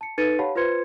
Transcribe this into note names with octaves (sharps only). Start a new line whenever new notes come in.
A5 C#7
D#4 A4 B4 A6 C#7 D#7
G4 C#5 F5 F#5 A5 B5
F4 B4 C5 C6 G#6 C#7